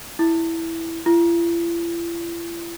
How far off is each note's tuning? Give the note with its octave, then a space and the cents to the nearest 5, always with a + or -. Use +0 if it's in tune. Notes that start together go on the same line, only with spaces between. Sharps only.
E4 +0
E4 +45